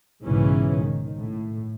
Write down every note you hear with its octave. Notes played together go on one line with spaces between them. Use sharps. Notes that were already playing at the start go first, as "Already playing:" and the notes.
B1 G#2 C#3 E3 C#4
D#3
A2